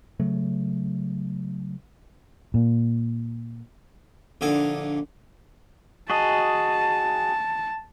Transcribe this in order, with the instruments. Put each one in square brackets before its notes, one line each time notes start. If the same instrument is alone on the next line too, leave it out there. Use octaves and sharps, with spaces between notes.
[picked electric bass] C#3 F#3 A3
[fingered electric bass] A#2
[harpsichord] A#1 A#2 D3 D#4 A4 G#5
[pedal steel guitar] F#4 G#4 D#5 [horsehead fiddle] A5